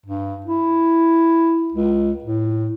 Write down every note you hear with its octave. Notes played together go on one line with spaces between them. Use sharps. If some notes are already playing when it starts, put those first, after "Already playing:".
G2
E4
C#2
A2